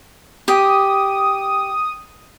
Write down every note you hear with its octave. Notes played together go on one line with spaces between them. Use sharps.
G4 D#6